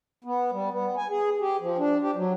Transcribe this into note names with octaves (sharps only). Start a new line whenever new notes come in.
B3
G3
B3
G#5
G#4
G4
F3
D4
G4
F#3